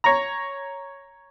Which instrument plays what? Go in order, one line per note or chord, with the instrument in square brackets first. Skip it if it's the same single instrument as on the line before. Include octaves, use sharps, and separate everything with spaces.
[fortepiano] C#5 A#5